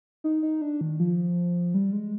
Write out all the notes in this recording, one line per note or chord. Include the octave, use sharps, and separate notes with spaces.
D#4
D#4
D4
D#3
F3
G3
G#3